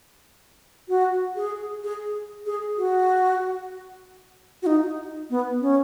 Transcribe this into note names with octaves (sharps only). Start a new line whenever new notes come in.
F#4
G#4
G#4
G#4
F#4
F#4
D#4
B3
C#4